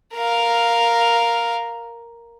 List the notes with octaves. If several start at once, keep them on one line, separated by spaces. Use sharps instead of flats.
A#4 F5